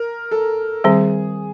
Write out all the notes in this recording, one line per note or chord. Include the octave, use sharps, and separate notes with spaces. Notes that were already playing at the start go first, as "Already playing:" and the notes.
Already playing: A#4
A4
D#3 G3 C4 G#4